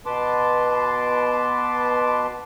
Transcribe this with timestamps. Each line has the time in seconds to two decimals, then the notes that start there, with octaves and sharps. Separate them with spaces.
0.06 B2 B4 A5 C6 D6